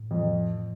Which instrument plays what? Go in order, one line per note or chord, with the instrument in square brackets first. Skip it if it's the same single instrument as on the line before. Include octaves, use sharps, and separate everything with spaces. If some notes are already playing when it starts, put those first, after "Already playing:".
Already playing: [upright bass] A2
[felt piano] F2